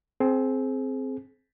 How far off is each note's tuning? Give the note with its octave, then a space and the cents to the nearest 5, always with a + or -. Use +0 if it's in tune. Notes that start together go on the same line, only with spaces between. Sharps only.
C4 +0 G#4 +35